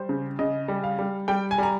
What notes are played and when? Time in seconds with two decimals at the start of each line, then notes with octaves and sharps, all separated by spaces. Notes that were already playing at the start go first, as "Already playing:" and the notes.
Already playing: G3 C5
0.09 C#3
0.39 C#3 D#5
0.68 G3
0.84 F5
0.99 G3
1.28 G3 G5
1.51 G#5
1.58 G3 A#5